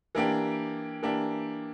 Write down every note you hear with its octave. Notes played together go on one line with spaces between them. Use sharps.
E3 A#3 D4 G4
E3 A#3 D4 G4